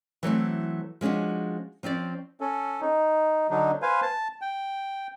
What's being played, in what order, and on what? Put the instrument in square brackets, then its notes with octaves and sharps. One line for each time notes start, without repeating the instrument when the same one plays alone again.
[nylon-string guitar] E3 F#3 A3 C4
F3 G#3 C#4 D4 F#4
F3 C4 C#4 D5
[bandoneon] C#4 A4
D#4
D3 F#3 D4 D#4
B4 C5 F5 G#5
A5
G5